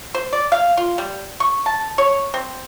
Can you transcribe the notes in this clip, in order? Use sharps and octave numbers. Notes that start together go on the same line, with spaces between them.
C5
D5
F5
F4
G3
C#6
A5
C#5
C4